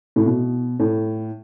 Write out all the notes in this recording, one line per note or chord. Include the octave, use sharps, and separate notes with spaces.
A2
B2
A2